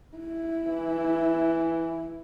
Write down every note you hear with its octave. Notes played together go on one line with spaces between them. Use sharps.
E4
E3